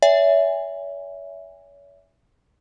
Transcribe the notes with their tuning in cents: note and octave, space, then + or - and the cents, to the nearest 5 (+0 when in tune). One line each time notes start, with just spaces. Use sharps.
C#5 +40 E5 +0 G#5 -25